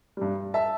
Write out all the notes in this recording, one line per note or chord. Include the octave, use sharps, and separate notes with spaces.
G2 G3
E5 A5